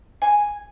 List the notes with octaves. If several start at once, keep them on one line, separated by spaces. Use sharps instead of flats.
G#5